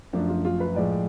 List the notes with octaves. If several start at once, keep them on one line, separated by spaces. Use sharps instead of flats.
F#2 F3 A3 D4
F4
F4
B4
A2 F3 G#3 D5